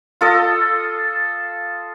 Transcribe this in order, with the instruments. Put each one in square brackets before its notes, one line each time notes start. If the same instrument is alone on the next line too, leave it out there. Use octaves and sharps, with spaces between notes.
[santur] F4 A4 D#5